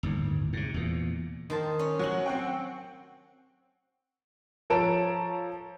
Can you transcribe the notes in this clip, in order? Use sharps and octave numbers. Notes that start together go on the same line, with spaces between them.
G1 D#2 A2
G#2 C3
E2 A#2
D#3 C5 A5
C#4
F#3 F#4 F#7
C4 F#5 G5
F3 A4 C#5 A#5 D7 E7